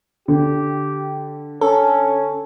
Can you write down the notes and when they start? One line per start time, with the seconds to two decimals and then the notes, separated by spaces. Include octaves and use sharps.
0.28 D3 G4
1.61 C#4 A4